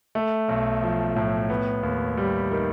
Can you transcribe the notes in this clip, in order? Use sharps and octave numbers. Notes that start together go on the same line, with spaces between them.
A3
B1
F3
A2
B3
D#2
G3
D#3